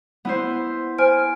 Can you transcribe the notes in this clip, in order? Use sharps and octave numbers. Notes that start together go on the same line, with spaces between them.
B3 E4 C5
C5 G#5 F6 D7